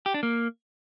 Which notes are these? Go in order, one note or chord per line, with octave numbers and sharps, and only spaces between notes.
G4
D4
A#3